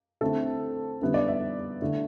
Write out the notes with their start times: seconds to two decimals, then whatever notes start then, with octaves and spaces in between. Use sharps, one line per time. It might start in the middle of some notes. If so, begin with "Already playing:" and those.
0.21 D3 A3 C4 E4 A4
1.02 D3 G3 B3 E4
1.14 D5
1.28 E5
1.82 D3 A3 E4